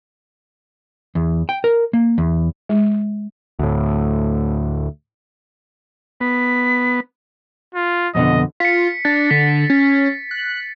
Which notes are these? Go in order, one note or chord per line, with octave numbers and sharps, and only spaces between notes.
E2
G5
A#4
A#3
E2
G#3
D2 A2
B3 B6
F4
F2 B2 D3 D#5
F4 B6 C#7
D4 A6
D3 B6
C#4
F#6